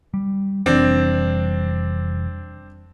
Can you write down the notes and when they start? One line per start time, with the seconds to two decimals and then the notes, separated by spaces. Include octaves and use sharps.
0.14 G3
0.66 F1 E3 G3 C4 D4